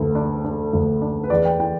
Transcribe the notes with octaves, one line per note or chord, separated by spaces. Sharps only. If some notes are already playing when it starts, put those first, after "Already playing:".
Already playing: D2 A3
D4
D4
D2
D4
B4
E2 D5
G5
E3 G5